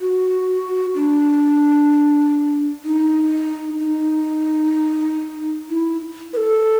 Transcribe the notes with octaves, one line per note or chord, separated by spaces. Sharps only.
F#4
D4
D#4
D#4
E4
B4
A4